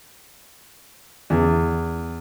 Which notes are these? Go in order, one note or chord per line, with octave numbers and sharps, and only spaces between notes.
E2